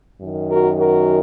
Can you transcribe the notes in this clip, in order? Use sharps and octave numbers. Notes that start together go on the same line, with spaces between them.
F#2 D#3
F#4 A#4
F#4 A#4